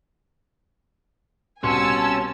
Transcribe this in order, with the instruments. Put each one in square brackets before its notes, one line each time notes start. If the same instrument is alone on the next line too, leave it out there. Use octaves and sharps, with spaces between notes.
[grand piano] C2 B2 [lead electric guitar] C#4 [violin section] G#5 A5 E6 [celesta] C6 C#7